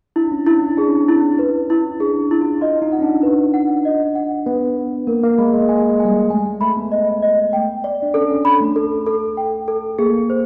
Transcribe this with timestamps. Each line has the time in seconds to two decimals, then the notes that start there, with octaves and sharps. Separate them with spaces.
0.16 D4 E4
0.32 C#4
0.46 C#4 E4
0.62 D4
0.77 D4 G#4
0.88 C#4
0.98 C4
1.09 C#4 E4
1.39 B4
1.70 E4
2.00 D4 G#4
2.31 E4
2.41 F4
2.61 F4 D#5
2.82 D#4
2.93 F#5
2.99 C#4
3.02 D4
3.23 B4
3.54 F#5
3.85 D#5
4.15 F#5
4.46 B3 B4
4.77 B4
5.07 A#3 A#4
5.23 A#3
5.38 G#3 B5
5.53 G#3
5.69 G#3 G#5
5.90 G#3
6.00 G#5
6.05 G3
6.10 G#3
6.30 A3 G#5
6.46 G#3
6.61 A3 B5
6.77 B3
6.92 D#5
7.22 D#5
7.53 G5
7.84 D5
8.02 D4
8.14 C#4 A4
8.29 C#4
8.45 D4 B5
8.60 A3
8.76 A4
9.06 A4
9.37 G5
9.68 A4
9.99 A#3 G#4
10.30 C5